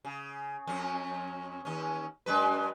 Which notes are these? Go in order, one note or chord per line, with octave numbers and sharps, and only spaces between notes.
C#3
F2 C#4
D#2 C#4
F#2 G#3 B4